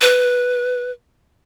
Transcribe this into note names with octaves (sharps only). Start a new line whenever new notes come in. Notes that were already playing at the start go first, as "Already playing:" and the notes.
B4